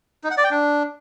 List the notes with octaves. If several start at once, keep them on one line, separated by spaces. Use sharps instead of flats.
D#4
F#5
D5
G5
D4